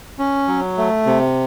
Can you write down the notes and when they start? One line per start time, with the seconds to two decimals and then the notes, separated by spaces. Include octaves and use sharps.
0.19 C#4
0.48 F#3
0.78 A3
1.06 C3